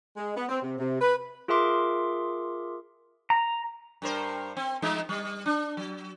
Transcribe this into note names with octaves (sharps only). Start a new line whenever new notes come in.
G#3
B3
C4
C3
C3
B4
F4 G#4 A#4 E5 C6 D6
A#5
G2 A#4 C5
C4
F3 G#3 D#4
G3
D4
F#3